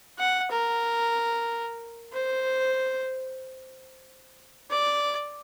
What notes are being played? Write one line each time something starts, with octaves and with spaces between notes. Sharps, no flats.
F#5
A#4
C5
D5